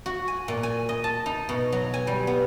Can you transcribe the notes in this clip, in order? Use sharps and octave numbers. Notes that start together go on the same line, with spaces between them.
F#4
G#5
A#2
G#5
D#5
A5
D#4
B2
F#3
G#5
G3
B3